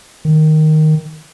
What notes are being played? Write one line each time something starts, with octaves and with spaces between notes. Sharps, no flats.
D#3